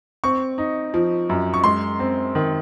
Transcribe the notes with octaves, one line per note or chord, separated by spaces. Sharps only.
C4 C#6
D#4
F3
F#2
C#6
G#3 C6
C4
D#3